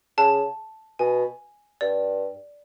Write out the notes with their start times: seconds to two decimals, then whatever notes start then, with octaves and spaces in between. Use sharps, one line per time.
0.18 C#3 A5
0.99 B2 G#5
1.81 G2 D5